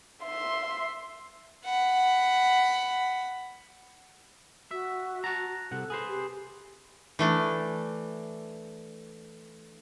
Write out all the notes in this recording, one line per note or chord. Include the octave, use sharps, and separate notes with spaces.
E5 C6
F#5 B5
F#4 E5
F#5 A5 A#5
C2 C3 A4 F#5
G#4 B4 C5
G4
E3 A3 D4